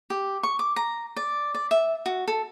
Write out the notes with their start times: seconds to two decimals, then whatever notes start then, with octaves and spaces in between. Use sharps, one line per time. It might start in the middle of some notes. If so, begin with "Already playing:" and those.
0.10 G4
0.43 C#6
0.59 D6
0.76 A#5
1.16 D5
1.54 D5
1.71 E5
2.06 F#4
2.28 A4